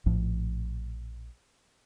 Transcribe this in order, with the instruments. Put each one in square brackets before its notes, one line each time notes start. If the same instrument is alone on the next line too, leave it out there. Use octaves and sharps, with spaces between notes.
[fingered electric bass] A#1 A2 F3